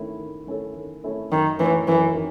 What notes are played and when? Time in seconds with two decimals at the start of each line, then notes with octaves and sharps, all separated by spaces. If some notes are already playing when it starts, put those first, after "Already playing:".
Already playing: D#3 A3 C#4 E4 A4
0.19 D#3
0.47 A3 C#4 E4 A4
0.76 D#3
1.04 A3 C#4 E4 A4
1.32 F#2 D#3
1.60 D#3 E3 A3 C#4
1.88 F#2 E3
2.15 D#3